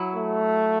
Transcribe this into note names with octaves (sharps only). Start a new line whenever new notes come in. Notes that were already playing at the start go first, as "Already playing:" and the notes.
Already playing: F#3 E4
A3